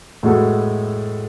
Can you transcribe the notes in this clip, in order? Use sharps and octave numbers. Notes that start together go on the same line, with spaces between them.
A2 G#3 B3 F#4 A4